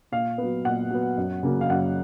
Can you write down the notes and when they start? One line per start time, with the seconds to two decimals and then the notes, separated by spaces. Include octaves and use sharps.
0.12 A#2 F5
0.38 F#3 B3
0.65 A#2 F#5
0.90 F#3 B3
1.18 F#2
1.43 C#3 F#3 A#3
1.61 F5
1.70 F#2 F#5